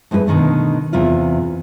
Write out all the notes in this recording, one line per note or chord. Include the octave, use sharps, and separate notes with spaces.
F2 G#3 E4 G#4 B4
B2 D3 D#3 F3 A3
E2 C3 E4 F4